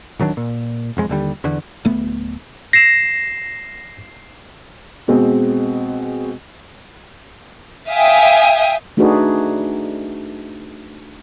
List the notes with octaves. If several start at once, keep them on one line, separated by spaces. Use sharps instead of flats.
D1 D#3 F#3 D4
A#2
E1 F2 G#3
D#2 D3 G3
E2 D3
D1 A3 B3
A#6 C7 E7
B2 G#3 C4
E5 F5 G5 G#5 D#6
A3 D4 D#4 F#4 G#4 B4